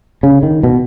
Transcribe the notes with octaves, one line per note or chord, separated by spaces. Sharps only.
C#3
D#3
B2